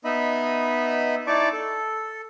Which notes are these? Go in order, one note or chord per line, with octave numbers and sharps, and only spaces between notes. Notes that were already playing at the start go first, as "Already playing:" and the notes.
B3 D#4 D#5 E5 B5
D#4 E4 D5 A5 C#6 D6
A4